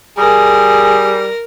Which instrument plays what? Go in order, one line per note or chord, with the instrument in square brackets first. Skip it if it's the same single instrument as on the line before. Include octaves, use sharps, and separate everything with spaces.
[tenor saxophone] G3 [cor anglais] G#4 [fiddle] A#4